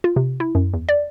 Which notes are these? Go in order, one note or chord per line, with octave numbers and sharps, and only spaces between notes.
F4
C3
E4
F#2
E2
D5